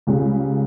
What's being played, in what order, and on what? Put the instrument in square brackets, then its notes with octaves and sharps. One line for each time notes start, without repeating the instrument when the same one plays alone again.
[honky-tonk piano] C#2 C#3 G3